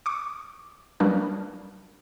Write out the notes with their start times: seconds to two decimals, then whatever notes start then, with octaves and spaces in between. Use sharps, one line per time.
0.06 C#6 D6
1.00 F#3 G3 A#3 C#4 D4 B4